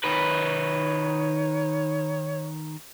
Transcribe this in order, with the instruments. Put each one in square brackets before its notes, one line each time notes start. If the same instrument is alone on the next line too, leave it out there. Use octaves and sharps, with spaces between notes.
[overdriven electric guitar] D#3 B4 [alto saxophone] C#5